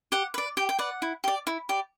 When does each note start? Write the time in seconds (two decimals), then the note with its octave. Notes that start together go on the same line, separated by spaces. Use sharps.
0.12 G4 F#5
0.34 B4 D5
0.57 G4 G5
0.69 G5
0.79 B4 D5 F#5
1.02 E4
1.24 G4 D5
1.47 E4
1.69 G4 D5